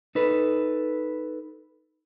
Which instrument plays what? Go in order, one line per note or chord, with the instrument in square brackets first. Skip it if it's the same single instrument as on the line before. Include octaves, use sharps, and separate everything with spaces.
[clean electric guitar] D#4 A4 B4